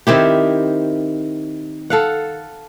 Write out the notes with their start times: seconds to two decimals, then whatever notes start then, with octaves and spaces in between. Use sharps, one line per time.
0.07 D#3 C4 E4 G4
1.90 A4 F5 F#5